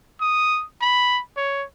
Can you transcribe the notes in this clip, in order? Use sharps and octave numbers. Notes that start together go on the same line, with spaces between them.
D#6
B5
C#5